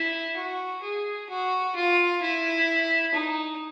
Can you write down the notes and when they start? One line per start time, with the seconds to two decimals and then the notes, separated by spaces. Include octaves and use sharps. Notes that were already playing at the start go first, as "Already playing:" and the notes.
Already playing: E4
0.37 F#4
0.83 G#4
1.29 F#4
1.75 F4
2.22 E4
3.14 D#4